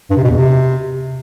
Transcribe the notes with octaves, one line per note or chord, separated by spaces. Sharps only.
G2
C3
B2
E2
C3